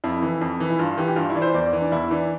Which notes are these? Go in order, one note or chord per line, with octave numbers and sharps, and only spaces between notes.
F2 E4
E3
F2
E3
E4
G2 F4
E3 G4
G4
G2 F4
E4
E3 D5
C5
E2 D5
E3
D4
E2 E4
E3 D4